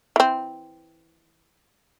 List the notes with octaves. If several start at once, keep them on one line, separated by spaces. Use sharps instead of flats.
E3 C4